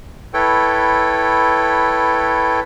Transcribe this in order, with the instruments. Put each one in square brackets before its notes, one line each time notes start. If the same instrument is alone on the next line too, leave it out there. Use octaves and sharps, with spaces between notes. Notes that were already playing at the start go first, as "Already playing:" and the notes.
[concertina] E4 A4 B4 C#5 G5